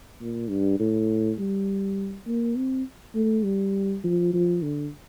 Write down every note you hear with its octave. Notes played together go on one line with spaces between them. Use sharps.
A#2
G2
A2
G3
A#3
C4
A3
G3
F3
F3
D3